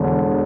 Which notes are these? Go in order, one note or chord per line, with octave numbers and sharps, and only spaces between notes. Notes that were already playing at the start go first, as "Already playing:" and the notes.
Already playing: E1 E2 D3